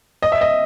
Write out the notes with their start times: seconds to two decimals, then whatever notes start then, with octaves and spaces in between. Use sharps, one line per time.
0.22 D#5
0.32 E5
0.41 D#5